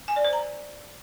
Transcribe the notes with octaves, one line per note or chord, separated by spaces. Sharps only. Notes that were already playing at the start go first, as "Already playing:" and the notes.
G#5
D5
C5
A#5